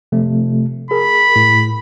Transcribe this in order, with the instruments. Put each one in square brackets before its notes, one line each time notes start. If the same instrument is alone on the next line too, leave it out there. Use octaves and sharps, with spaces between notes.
[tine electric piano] C3 F3 A3
[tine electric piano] G#4 A#4 [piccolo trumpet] B5
[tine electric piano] A2